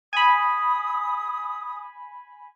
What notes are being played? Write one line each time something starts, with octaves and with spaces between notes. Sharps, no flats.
G#5 B5 D#6